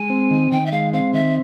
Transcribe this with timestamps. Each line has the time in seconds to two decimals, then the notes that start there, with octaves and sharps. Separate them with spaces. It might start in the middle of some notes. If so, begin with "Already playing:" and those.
Already playing: G#3 G#5
0.10 C4
0.31 D#3
0.51 D#3 G5
0.66 E5
0.72 G#3 F5
0.93 C4 F5
1.13 D#3 E5